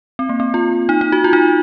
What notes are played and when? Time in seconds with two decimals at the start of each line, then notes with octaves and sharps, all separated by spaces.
0.19 C4
0.29 A#3
0.40 C4
0.54 F4
0.89 D#4
1.01 D#4
1.12 F#4
1.24 F4
1.33 D#4